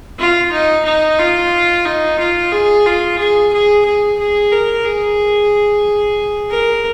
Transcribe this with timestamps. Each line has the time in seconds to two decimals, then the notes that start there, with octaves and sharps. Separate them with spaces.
0.19 F4
0.52 D#4
0.85 D#4
1.19 F4
1.85 D#4
2.19 F4
2.52 G#4
2.86 F4
3.19 G#4
3.53 G#4
3.85 G#4
4.19 G#4
4.52 A#4
4.85 G#4
6.52 A#4